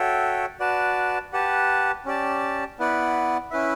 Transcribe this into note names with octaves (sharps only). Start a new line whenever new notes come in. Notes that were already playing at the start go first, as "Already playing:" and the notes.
Already playing: F#4 A4 C#5 E5 G5
F#4 B4 D5 A5
G4 B4 F#5 A5
C#4 G4 D5 A5
B3 E4 B4 D5 F#5
C#4 E4 B4 E5